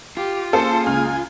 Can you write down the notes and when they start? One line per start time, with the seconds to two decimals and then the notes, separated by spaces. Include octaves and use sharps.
0.17 F4 G4
0.53 A#3 C#4 G#4 A4 C5
0.86 C#2 G#5 F6